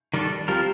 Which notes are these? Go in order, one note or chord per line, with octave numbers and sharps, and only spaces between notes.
D#3 G3 D4 A4
F3 G3 C4 F4 A#4